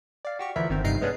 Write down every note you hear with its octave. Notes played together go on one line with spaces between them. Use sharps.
D5 F5
F#4 G4 C#6
D2 E3 F3 A#4 E5 B5
G1 D#3 C4 A#4
G2 C3 D#4 A#5 C7 D7
G#3 B3 C#4 D4 G#4